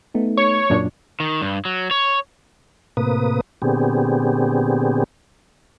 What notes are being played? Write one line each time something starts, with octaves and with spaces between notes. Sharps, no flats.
A3 B3 D#4
C#5
F#2 A#2 D4
D#3
G2
F#3
C#5
A2 C3 A#3 B4 D#6
A#2 D3 B3 C4 G4 G#4